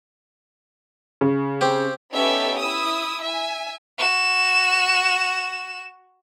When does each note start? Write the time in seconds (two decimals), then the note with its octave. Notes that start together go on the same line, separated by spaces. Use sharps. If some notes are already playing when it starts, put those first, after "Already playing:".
1.21 C#3
1.61 C4 G4
2.14 B3 C#4 D#4 G4 A4 E5
2.59 E4 D#6 E6
3.23 E5 G#5
3.99 F#4 E7